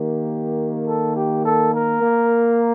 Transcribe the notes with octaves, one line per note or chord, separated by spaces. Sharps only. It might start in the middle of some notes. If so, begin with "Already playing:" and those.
Already playing: D#3 A#3 G4
A4
G4
A4
A#4
A#3